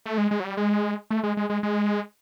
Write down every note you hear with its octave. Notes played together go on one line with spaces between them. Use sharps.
A3
G#3
G#3
F#3
G3
G#3
A3
G#3
G#3
G#3
G#3